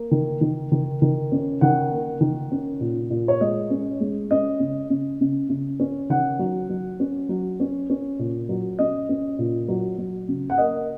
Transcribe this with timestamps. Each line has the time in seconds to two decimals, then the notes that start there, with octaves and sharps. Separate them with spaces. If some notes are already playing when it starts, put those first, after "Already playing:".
Already playing: A#3
0.11 D#3
0.41 D#3
0.72 D#3
1.02 D#3
1.32 C#4
1.61 D#3 F#5
1.91 A#3
2.21 D#3
2.52 C#4
2.81 A#2
3.10 A#2
3.28 C#5
3.41 G#3 D#5
3.70 C#4
4.01 G#3
4.31 C#4 D#5
4.60 C#3
4.90 C#3
5.21 C#3
5.49 C#3
5.80 C#4
6.10 D#3 F#5
6.39 F#3
6.69 F#3
7.00 C#4
7.29 F#3
7.60 C#4
7.90 C#4
8.19 A#2
8.49 F#3
8.79 C#4 D#5
9.09 C#4
9.39 A#2
9.68 F#3
9.98 F#3
10.28 C#3
10.50 F#5
10.58 A#3 D#5